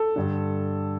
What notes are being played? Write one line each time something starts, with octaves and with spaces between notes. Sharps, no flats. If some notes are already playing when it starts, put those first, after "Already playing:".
Already playing: A4
G2 D3